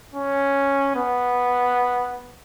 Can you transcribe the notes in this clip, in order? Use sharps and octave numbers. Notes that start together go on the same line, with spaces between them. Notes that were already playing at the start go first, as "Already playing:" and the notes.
C#4
B3